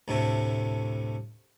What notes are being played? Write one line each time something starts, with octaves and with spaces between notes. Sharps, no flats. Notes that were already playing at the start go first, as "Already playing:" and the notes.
D2 A2 C3 A3